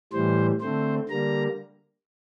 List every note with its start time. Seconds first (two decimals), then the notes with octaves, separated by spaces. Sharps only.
0.13 A2 E3 G3 C5
0.61 D3 A3 C4 C5
1.09 D3 G3 A#3 A#5